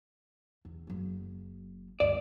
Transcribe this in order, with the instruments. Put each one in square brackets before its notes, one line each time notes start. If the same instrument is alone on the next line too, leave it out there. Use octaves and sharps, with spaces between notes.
[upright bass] E2
F#1 F#3
[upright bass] D2 G2 [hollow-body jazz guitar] D5